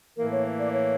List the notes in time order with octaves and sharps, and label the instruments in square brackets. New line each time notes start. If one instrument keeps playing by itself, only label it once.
[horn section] A2 E3 A#3 [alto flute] A#4
[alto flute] C#5
D5
C#5